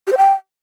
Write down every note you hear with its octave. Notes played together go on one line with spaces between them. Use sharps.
G4
C5
G5